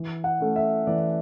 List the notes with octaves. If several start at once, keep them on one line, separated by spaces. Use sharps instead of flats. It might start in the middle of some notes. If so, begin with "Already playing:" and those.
Already playing: E3
F#5
A3 C#4
E5
E3 D5